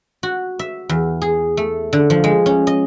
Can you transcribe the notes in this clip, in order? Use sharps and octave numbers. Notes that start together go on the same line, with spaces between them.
F#4
E5
E2
G#4
A3
D3
F3
G#3
C#4
D#5